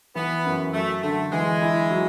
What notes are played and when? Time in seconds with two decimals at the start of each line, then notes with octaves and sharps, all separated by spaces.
0.15 E3 B3
0.45 F#2
0.74 F#3 A3
1.03 D3 A3
1.32 E3 G#3
1.62 E4
1.90 F#3